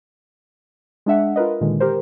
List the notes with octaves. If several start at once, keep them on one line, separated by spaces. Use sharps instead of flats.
G#3 D4 E5 F#5
F4 A#4 B4 D#5
A#2 D3 D#3 G#3
G4 A#4 C5